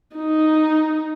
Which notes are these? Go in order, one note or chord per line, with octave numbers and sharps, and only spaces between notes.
D#4